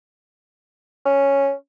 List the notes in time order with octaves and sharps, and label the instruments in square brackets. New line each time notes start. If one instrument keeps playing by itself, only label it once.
[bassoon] C#4